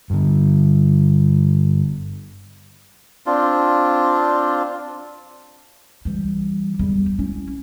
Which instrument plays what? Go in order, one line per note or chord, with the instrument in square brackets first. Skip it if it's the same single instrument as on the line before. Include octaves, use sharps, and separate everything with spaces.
[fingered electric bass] G2 D3
[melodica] C4 D4 F4
[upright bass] E3 G3
E2 G3
C#4 E4